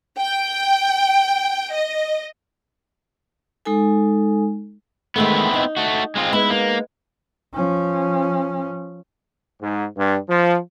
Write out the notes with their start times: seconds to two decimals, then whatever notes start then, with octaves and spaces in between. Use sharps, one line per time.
0.18 G5
1.73 D#5
3.65 G#3 D#4 A4 G#5
5.16 D#3 G#3 A3 B3 C4 E4
5.54 D#4
5.77 A3 F#4
6.16 G#3 C4 F4
6.33 G#3 B3 D#4 E4
6.50 A#3
7.54 F3 C#4
9.62 G#2
9.98 G2
10.29 F3